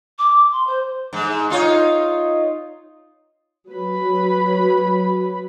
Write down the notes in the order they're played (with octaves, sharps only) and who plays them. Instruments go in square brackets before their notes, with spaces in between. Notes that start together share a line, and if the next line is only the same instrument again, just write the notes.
[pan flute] D6
C6
C5
[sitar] G#2
D#4 F4 C#5
[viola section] F#3 B4 B5